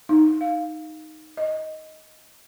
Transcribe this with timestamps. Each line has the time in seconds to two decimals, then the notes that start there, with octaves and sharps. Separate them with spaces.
0.09 D#4
0.41 F5
1.37 D#5